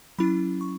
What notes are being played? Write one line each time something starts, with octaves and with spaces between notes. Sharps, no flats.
F#3 C#4 E4 B5
C#6